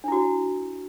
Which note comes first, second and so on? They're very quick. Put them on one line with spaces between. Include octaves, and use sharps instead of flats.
D4 E4 F#4